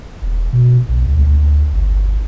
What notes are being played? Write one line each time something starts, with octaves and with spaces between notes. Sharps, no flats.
E1
B2
B1
D2
G1